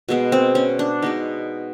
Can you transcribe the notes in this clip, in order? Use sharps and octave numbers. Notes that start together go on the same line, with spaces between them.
B2 G#3 B3
C4
C#4
D4
B2 G#3 B3 D#4